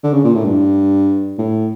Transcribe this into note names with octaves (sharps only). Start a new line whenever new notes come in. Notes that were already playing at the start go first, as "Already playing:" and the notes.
D3
C#3
A#2
A2
G2
A2